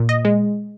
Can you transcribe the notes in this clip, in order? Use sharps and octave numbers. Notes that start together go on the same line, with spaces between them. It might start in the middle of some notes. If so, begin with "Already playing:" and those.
Already playing: A#2
D#5
G#3